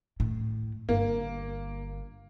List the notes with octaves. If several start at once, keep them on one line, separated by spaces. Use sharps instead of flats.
A2
G1 A#3